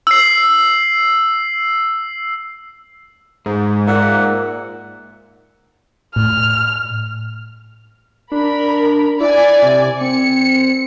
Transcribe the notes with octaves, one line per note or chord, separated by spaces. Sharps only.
E6 C7
G#2 G#3
A#2 A#3 E5 F#5
A2 F6
D4 A#4 B5
E4 D5 G#5
C3
C4 C#7